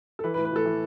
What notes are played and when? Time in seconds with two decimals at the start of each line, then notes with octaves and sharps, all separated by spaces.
0.19 A4
0.24 E3 B4
0.34 B4
0.38 A2
0.45 B4
0.52 A2 A4
0.65 E3